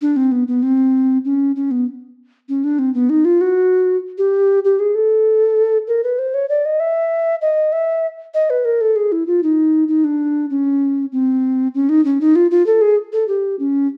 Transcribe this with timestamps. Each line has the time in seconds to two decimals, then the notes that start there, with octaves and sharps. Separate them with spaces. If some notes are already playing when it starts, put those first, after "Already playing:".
0.02 D4
0.16 C4
0.32 B3
0.48 B3
0.63 C4
1.25 C#4
1.56 C#4
1.71 B3
2.49 C#4
2.64 D4
2.79 C4
2.94 B3
3.10 D#4
3.25 F4
3.41 F#4
4.18 G4
4.65 G4
4.79 G#4
4.95 A4
5.88 A#4
6.04 B4
6.19 C5
6.34 C#5
6.49 D5
6.65 D#5
6.80 E5
7.42 D#5
7.72 E5
8.34 D#5
8.50 B4
8.65 A#4
8.81 A4
8.96 G#4
9.12 E4
9.27 F4
9.43 D#4
9.88 D#4
10.04 D4
10.50 C#4
11.12 C4
11.75 C#4
11.89 D#4
12.05 C#4
12.21 D#4
12.36 F4
12.51 F4
12.67 A4
12.81 G#4
13.13 A4
13.28 G4
13.59 C#4